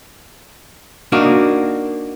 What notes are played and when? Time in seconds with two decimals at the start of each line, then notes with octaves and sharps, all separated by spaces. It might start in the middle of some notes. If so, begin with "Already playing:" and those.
1.12 A#3 D4 D#4 F#4